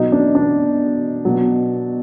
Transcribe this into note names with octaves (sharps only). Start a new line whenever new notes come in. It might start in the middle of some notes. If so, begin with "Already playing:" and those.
Already playing: B2 F#3 D#4
D4
D4
B2 F#3